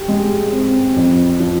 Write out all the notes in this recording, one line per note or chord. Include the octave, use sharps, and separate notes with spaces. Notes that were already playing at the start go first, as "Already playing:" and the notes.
Already playing: G4
G#3
C4
F2
F3